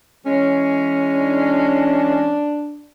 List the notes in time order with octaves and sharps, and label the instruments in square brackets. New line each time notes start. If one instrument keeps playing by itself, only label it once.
[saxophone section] E3 G#3 C#4
[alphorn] D4